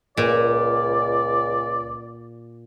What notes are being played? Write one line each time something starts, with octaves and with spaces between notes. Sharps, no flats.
C#2 A#2 D5